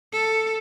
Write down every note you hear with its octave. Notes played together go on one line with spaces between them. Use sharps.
A4